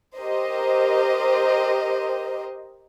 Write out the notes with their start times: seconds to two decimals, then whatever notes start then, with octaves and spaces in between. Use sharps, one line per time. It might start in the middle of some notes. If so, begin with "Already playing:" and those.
0.17 G4 A#4 C5 D#5